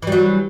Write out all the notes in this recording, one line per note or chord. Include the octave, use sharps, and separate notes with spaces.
E3 F#3 G3